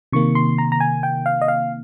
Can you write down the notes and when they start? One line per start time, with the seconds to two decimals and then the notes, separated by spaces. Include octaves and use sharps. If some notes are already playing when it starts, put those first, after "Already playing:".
0.12 C3 D#3 A#3 C#6
0.35 C6
0.58 A#5
0.72 A#5
0.80 G#5
1.03 G5
1.26 F5
1.42 D#5
1.48 F5